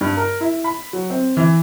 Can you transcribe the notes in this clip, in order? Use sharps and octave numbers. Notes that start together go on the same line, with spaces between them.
G2
A#4
E4
B5
F#3
C4
E3